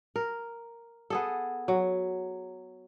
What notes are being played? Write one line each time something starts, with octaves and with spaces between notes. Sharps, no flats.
A#4
B3 G#4 A4
F#3